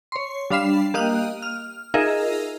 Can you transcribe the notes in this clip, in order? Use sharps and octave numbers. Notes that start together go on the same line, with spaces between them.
C#5 C6
G3 D4 F5 B5 C7 E7
A#3 G4 D#5 F5 F#6 D#7
F6
D#4 F4 G#4 A#4 D#5 E5